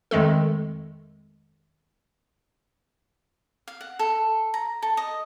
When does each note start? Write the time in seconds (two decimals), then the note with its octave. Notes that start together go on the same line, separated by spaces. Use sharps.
0.11 F2 D#3 G#3 A3 A4
3.68 F5
3.81 F#5
3.99 A4
4.54 A#5
4.82 A4
4.97 D#5